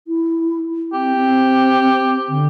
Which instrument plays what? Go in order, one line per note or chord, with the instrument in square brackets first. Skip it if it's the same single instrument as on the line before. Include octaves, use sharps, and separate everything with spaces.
[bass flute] E4
[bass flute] C4 [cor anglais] G4
[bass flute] C4
D3